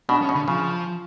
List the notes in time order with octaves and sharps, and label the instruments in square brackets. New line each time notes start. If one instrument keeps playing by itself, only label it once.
[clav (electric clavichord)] B2 [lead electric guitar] D4
[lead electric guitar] C#4
[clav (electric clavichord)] B2
[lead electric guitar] D3
[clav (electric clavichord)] C#3 [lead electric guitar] F3